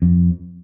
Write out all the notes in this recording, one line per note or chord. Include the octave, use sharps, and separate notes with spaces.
F2